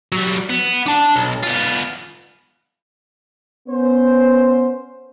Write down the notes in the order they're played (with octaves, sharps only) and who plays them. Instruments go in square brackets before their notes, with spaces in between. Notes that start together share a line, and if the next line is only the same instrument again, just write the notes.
[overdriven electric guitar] F#3 G3
B3
D4 A5
B1
B3 F4
[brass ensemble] B3 C#4 C5